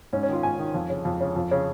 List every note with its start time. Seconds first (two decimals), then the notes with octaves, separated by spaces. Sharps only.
0.13 G#2 C#4
0.23 C#4
0.29 D#3 F4
0.43 G#2 G#5
0.59 D#3
0.74 F2
0.90 C#3
1.05 F2
1.20 C#3
1.36 F2
1.51 C#3